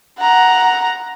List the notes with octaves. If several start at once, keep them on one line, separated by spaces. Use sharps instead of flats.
F#5 A#5